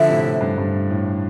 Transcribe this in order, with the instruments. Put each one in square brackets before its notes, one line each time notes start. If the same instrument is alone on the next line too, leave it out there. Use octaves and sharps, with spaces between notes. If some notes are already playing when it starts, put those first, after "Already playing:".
Already playing: [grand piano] D3 F3 [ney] E5
[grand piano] A2 C3
A2
G2
G2
A2